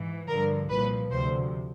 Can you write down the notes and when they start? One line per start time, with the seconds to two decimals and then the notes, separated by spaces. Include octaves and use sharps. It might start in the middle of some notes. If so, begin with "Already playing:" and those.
Already playing: G#2 E3
0.28 G2 D3 F3 A#4
0.69 C2 A#2 F3 B4
1.10 D2 C3 F3 C5